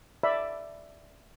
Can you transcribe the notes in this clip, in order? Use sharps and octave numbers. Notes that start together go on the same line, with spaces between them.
D5 E5 B5